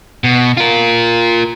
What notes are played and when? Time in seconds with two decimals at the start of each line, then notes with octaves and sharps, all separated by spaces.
0.24 B2
0.57 F4 A#4